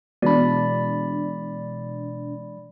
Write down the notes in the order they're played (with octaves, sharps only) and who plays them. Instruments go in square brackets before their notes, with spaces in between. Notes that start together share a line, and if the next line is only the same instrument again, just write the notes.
[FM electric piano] B2 D4 [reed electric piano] E3 G#3 [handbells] D5 B5